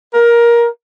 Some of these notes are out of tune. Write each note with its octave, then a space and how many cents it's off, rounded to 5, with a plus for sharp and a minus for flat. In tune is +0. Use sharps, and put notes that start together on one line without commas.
A#4 +15